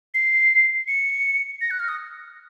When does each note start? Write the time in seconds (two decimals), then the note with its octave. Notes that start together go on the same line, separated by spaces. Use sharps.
0.14 C7
0.88 C#7
1.61 A#6
1.71 F#6
1.80 F6
1.88 D#6